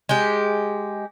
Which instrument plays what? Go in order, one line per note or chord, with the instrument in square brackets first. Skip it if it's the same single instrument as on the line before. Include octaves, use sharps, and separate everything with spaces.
[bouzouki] G#3 G4